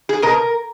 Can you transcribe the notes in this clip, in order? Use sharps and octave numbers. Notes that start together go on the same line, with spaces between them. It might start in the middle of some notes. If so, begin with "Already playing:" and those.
G#4
B2 A#4